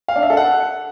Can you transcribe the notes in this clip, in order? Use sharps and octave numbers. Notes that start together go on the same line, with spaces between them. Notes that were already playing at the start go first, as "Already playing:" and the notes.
F5
D4
E5
A4
F#5